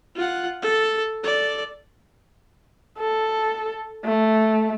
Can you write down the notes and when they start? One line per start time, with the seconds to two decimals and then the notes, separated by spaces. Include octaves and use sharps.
0.16 F4 F#5
0.62 A4
1.23 A4 D5
2.99 A4
4.05 A3